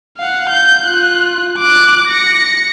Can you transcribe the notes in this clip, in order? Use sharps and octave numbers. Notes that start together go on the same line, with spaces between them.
F5 F#5
G6
F4 F#6
D6 F#6
A#6 C#7